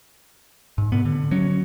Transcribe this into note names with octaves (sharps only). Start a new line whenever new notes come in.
G#2
A2 C3 B3
D3
F#3 C#4